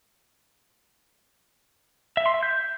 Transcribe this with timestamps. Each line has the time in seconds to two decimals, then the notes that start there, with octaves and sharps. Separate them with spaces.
2.17 E5
2.26 C6
2.34 E5
2.43 G6